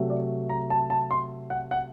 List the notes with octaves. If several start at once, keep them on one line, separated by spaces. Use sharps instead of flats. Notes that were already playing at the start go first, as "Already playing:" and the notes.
Already playing: C3 F#3 A3
D5
A#5
A5
A5
C6
F#5
F#5